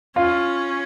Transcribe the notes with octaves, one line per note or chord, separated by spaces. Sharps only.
C#4 F4